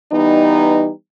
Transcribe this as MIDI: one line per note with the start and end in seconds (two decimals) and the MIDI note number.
0.12 0.90 52
0.12 0.90 55
0.12 0.90 59
0.12 0.90 63